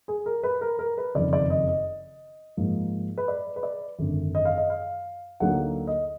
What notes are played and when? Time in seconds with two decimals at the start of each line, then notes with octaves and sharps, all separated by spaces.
0.08 G#4
0.26 A#4
0.43 B4
0.61 A#4
0.79 A#4
0.98 B4
1.15 F#1 F2 D#3 D5
1.33 D5
1.50 D#5
1.68 D#5
2.57 G#2 F3 A#3
3.18 B4
3.28 D5
3.56 B4
3.63 D5
3.98 G#1 F#2 D3
4.35 D#5
4.45 F5
4.58 D#5
4.70 F5
5.40 D2 D3 F#3 A#3 D#4 F#5
5.87 D#5